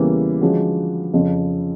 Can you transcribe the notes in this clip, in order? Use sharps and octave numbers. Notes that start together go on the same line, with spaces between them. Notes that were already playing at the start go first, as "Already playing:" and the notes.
Already playing: E2 C#3 E3 G3 A#3
D3 F3 G#3 C#4 F#4
F2 C#3 F3